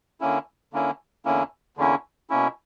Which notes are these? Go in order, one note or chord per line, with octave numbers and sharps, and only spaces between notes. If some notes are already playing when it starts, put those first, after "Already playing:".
D3 A#3 C#4 E4
D3 A#3 C#4 E4
E2 D3 A#3 C#4 E4
E2 D3 A#3 C#4 E4
B2 A#3 C#4 E4